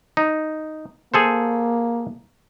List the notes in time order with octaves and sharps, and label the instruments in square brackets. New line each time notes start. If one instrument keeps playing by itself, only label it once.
[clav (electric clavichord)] D#4
[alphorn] A#3 [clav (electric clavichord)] G#4 A4 C5